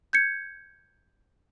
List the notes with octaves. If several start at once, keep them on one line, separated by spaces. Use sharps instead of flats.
G6 G#6 C#7